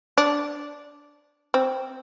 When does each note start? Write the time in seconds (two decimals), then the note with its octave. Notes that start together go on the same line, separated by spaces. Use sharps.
0.18 D4
1.54 C4